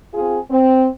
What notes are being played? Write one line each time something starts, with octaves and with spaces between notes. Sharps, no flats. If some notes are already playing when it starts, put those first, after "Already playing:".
C4 F4 G#4
C4